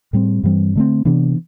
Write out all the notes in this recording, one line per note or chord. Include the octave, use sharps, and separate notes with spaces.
A2 G3 C4
G2 E3 G3 C4
D3 A3 C4
C3 E3 B3 D4